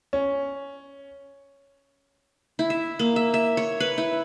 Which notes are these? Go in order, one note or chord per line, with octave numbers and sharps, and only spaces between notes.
C#4
E4
E5
A#3
E5
E5
C#5
B4
E4